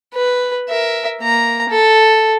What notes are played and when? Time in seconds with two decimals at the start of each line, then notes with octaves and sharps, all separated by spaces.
0.14 B4
0.69 A#4 E5
1.21 A#3 A#5
1.69 A4